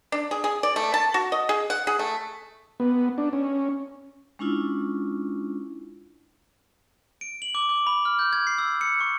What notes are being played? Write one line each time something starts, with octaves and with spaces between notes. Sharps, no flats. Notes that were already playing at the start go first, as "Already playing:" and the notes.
D4
G#4
G#4
D5
A3
A5
F#4
D#5
G#4
F#5
G#4
A3
B3
D4
C#4
G#3 C#4 D4 E4 F4
D7
F#7
D6
D6
B5
F6
G6
G#6
C7
E6
C#7
C#6